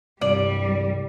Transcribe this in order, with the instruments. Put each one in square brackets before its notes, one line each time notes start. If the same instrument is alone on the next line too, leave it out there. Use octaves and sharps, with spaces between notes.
[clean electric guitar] C2 G2 [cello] G3 [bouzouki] D5